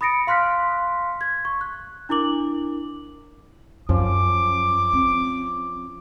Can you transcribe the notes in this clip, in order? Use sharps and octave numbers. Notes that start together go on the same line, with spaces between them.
B5 D#6 A6 A#6 C#7 D7
F5 C6 F6 F#6 B6
G#6
C#6
F#6
D4 E4 A#4 D6 F#7
F#2 F3 C#4 F4 D6
C4